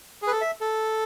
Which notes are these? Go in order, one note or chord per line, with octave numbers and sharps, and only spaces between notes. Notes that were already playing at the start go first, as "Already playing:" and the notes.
G#4
B4
A4
E5
A4